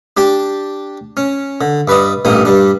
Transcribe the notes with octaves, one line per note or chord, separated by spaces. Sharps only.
D4 G4 A5 D6
C#4
D3
G2 B4 D5 D#5
A1 G2 A#2 D#4 D#6
G2 G3 D4